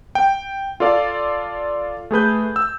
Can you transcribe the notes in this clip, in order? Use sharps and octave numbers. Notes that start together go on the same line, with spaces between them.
G5
F4 A4 D5 F5
A3 G#4 B4 G6
E6